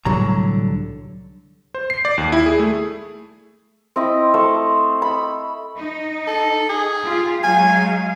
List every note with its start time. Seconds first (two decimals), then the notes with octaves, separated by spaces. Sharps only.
0.05 C2 A2 D3 F#3 G3 A#5
1.74 C5
1.90 C7
2.05 D5
2.18 D#2
2.32 E4
2.46 G#4
2.60 A3
3.96 C4 E4 D#5
4.34 A3 C5
5.02 B5
5.76 D#4
6.27 A4
6.69 G#4
7.03 F4 G4 F5
7.44 F#3 G#3 F5 G#5